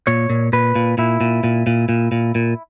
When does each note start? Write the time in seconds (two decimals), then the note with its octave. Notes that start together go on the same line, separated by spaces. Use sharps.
0.07 A#2 C#5
0.30 A#2
0.53 A#2 B4
0.75 A#2
0.98 A#2 E4
1.21 A#2
1.44 A#2
1.67 A#2
1.89 A#2
2.12 A#2
2.35 A#2